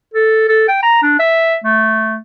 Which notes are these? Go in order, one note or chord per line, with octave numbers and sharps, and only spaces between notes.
A4
A4
G5
A#5
D4
E5
A3